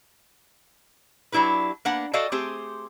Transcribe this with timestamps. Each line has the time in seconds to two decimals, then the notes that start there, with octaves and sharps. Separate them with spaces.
1.32 F#3 D4 E4 G4 B4
1.85 A#3 B3 D4 F#5
2.13 F#4 A4 D5 D#5 F5 G5
2.32 A3 C4 G4 G#4 C5